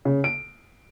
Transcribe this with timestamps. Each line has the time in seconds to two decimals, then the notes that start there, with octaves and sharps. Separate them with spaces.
0.05 C#3
0.24 D7